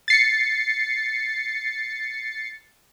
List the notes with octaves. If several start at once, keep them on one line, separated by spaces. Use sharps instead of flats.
A6 C7 C#7